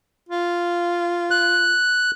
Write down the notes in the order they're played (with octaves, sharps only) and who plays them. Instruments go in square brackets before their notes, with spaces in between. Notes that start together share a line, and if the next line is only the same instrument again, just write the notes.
[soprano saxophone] F4
[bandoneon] F#6